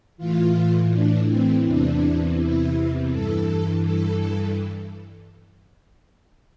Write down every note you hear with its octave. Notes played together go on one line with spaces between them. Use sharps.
A2 E3 F4
D4
C4
E2 C3 E3 D4
E4
G2 E3 A4
A4